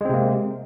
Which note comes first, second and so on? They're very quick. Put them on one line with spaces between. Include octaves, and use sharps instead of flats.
G#3 C4 C3 A#3